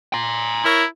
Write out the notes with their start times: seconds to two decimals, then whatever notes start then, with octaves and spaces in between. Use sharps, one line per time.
0.14 A#5 C6
0.65 E4 A#4 C#5